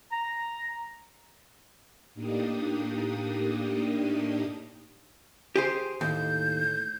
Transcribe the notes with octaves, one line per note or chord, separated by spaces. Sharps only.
A#5
A2 A#3 D4 D#4 G4 D#6
G4 G#4 C5
D#2 A2 G6